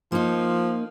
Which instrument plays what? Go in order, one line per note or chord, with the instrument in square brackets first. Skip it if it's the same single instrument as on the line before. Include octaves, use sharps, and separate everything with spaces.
[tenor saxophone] F3 [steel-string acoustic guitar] A#3 D#4